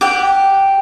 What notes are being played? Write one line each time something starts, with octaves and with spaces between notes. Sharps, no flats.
G4 F#5 G5